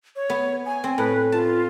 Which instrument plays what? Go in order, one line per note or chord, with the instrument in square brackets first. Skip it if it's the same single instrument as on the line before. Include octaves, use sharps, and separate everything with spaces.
[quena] C#5
[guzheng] B3
[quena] G#5
[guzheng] C4
[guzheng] A2 [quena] B4
[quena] F4 [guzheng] A5